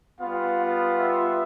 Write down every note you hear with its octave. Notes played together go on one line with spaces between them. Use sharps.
G3 B3 F4 F5
F5
E5